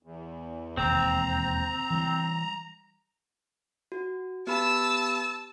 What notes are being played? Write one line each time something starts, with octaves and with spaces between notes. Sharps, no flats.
E2
E1 D#2 C4 A#5
E3 G3
F#4
B3 G4 A5 B5 E6